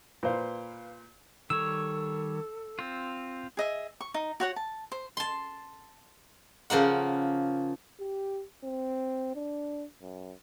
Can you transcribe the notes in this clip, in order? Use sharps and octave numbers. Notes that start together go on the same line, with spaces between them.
A#2 B4 C5 F5
D#3 G3 A4 C#5 E6
C4 F4
G#4 D#5 E5
C#6
D#4
F#4 C#5 F#5
A5
C5
A5 C6
C#3 F3 A#3 F#5
G4
C4
D4
F#2